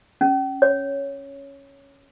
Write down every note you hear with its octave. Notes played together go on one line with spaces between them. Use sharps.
C#4
C#5